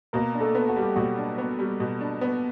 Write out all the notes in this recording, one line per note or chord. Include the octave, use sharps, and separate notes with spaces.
B2 A#3 A#4
D4
A3 A4
B3
F#4
G3
G4
B2 F#3 F#4
D4
B3
G3
B2
D4
B3